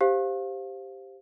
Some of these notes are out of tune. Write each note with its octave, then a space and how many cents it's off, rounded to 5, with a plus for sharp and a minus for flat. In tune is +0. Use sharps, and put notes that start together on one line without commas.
G4 +0 C5 +5 F5 +5